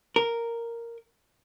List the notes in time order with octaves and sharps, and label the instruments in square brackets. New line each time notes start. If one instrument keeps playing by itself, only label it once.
[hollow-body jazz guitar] A#4